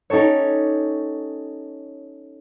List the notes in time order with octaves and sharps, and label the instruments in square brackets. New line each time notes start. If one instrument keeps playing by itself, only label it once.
[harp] C#4 D#4 G4 A4 C#5